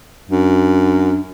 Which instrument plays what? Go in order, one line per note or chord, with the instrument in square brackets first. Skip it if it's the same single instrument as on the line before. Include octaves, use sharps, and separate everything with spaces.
[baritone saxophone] F#2 [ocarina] D4